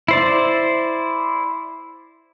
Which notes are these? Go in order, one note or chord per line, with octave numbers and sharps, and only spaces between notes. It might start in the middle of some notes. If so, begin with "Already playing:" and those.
E4 C5 D5